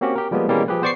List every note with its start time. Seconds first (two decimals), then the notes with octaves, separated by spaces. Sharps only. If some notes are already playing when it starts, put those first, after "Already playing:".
0.01 A#3 C4 C#4 F#4 G4
0.16 G4 A#4
0.31 F3 G3 G#3 A#3 B3
0.48 B2 E3 G3 G#3 A#3 C#4
0.68 F3 G4 G#4 B4
0.82 B3 C5 D5 C#6 D6 C7